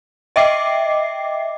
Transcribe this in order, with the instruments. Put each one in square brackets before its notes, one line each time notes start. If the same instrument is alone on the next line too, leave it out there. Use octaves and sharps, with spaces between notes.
[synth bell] D#5 E5 G5 D6 C7